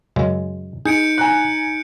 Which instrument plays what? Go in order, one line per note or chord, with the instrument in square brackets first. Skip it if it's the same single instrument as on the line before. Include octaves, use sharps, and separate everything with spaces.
[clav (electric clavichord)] F#2 C#3 G#3
[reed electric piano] D#4 [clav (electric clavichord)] G#4 [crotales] G6 C#7 D7
[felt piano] G#5 A#5 F#6